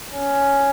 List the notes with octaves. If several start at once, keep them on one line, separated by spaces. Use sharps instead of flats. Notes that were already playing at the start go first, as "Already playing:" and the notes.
C#4